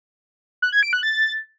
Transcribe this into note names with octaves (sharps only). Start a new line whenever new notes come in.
F#6
G#6
D7
F#6
A6